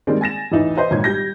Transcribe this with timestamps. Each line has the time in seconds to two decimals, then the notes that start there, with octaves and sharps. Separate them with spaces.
0.07 D#3 G3 G#3 A#3 C4 D5
0.21 G#5 A6 A#6 E7
0.52 A1 E2 E3 D#4
0.76 F#4 B4 C5 D#5 E5
0.91 G#1 A#2 C#5 G#6
1.04 G3 G6 A#6